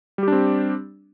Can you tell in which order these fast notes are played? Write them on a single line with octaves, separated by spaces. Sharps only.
G3 G4 D4 C4